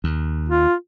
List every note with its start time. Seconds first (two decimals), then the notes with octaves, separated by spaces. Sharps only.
0.04 D#2
0.49 F4